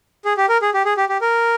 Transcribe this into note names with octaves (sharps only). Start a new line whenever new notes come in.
G#4
G4
A#4
G#4
G4
G#4
G4
G4
A#4